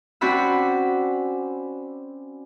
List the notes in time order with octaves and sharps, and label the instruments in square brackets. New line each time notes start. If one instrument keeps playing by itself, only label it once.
[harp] C4 C#4 F#4 D5 B5 E6